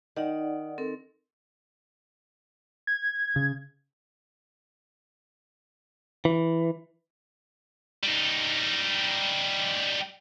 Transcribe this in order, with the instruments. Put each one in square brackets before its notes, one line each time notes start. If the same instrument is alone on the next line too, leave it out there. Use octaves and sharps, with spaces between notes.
[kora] D#3 [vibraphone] D#4 D5 F#5
[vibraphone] C4 A4 A#4
[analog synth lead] G#6
[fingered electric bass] C#3
[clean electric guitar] E3
[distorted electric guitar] G3 D#4